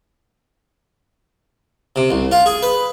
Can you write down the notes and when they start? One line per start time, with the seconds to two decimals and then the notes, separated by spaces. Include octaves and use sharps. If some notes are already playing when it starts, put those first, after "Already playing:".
1.96 C3
2.11 C2
2.32 F4
2.46 G#4
2.63 B4